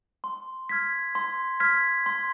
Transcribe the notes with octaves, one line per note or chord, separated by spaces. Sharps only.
C6
F6 G#6 B6
C6
F6 G#6 B6
C6